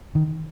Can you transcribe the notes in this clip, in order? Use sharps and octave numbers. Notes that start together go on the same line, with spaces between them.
D#3